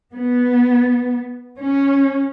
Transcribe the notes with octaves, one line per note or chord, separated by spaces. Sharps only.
B3
C#4